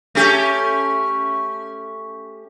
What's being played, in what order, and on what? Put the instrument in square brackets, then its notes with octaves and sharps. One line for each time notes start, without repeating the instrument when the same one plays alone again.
[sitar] A3 C#4 G4